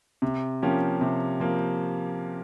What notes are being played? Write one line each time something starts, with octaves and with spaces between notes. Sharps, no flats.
C3
F3 A#3 C#4 G4
C3
F3 A#3